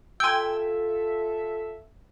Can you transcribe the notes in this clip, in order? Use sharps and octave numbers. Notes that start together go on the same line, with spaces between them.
F4 A4 E5 G5 G#5 C6 E6